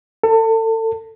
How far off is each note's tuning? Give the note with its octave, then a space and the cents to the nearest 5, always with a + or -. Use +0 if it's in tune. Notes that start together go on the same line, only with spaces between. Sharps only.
A4 +30